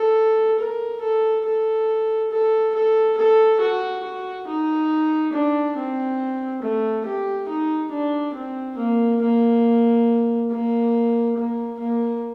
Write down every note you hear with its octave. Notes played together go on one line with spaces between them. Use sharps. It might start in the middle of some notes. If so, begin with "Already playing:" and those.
Already playing: A4
A#4
A4
A4
A4
A4
A4
F#4
F#4
D#4
D4
C4
A3
G4
D#4
D4
C4
A#3
A#3
A#3
A#3
A#3